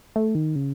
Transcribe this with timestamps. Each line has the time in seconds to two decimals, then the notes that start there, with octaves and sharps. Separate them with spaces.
0.16 A3
0.35 D#3
0.56 C#3